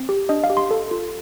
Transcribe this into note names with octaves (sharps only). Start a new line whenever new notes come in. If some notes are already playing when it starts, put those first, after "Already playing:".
Already playing: C4
G4
D4 D#5
F5
G4
C6
A4
F4